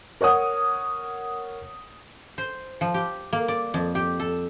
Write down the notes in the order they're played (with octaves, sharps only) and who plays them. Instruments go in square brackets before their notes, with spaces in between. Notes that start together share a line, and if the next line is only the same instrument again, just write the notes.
[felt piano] A#4 C#5 F#5 D#6
[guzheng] C5
F3
G4
A#3
D5
F2
G4
A4